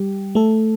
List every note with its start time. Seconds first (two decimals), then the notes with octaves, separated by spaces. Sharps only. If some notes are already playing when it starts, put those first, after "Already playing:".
Already playing: G3 G4
0.35 A3 A4